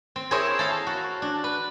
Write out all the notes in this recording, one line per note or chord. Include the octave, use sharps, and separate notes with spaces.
C4
E4 G#4 A#4 C5 C#5 E5
A4 F5
F#4
D4
B4